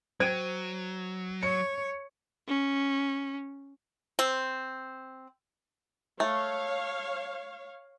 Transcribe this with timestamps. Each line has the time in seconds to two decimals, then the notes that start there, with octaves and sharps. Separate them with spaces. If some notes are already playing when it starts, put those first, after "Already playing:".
0.20 F#3 C5 G5 G#6 D7 D#7
1.43 C#5 C#7
2.48 C#4
4.19 C4
6.20 A3 C#5 F5